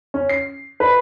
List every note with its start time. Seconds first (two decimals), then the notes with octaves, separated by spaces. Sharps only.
0.14 C#4
0.29 C7
0.80 B4